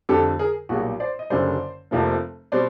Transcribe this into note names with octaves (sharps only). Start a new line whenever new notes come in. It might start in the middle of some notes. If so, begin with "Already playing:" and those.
F2 D3 G3 G4 A4
G#4 A#4
B1 A#2 G3 F#4 G#4
C5 D5
D#5
F#1 F#2 D3 G3 C5 D5
F1 F2 C3 F3 A#3
B2 G3 C4 C5 D5